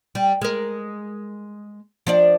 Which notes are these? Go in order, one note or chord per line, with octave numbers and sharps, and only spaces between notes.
G3
G#3 A#4
F3 D4 D5